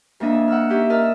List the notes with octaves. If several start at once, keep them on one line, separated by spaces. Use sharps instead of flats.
F2 A#3 D4 D#5 E5 G#5
F#5 E6 F6
C#4 D#4 G4 E5
A#4 D#5 E5 A5 E6 F6